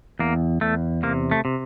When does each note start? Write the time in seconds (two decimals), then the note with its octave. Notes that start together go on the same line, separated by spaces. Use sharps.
0.19 E2 A#3
0.61 E2 A3
1.03 C3 A#3
1.31 A3
1.45 C3